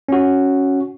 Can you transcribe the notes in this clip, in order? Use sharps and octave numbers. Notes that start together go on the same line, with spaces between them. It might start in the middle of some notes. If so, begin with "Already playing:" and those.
C#4 F#4